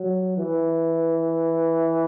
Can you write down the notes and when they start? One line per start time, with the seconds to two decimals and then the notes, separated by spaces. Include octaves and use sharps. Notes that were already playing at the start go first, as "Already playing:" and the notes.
Already playing: F#3
0.37 E3